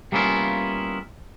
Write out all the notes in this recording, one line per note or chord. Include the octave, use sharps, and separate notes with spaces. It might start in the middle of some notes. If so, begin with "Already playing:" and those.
G3 A#3 B3 C#4 E4 F4